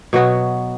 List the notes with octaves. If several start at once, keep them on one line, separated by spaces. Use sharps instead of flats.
B2 F#3 B3 F#4